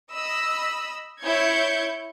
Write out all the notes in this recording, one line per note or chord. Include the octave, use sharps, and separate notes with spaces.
D#5 B5 E6
E4 C#5 G6 G#6 C#7